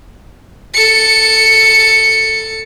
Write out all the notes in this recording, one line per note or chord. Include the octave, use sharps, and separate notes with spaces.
A4 C#7